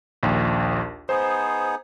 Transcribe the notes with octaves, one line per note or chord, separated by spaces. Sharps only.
A#1 D#2
B3 D#4 G#4 C5